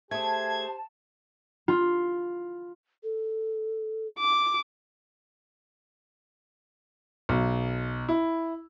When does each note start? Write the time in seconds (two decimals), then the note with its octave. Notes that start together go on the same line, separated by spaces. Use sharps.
0.11 A3 G4 G#4 C5 A5 G#6
1.68 F4
3.04 A4
4.19 D6
7.29 B1
8.09 E4